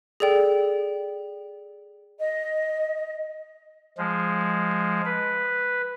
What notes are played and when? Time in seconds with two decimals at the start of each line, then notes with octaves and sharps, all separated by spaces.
0.20 G#4 A4 D5 G5
2.20 D#5
3.98 F3 G#3
5.05 B4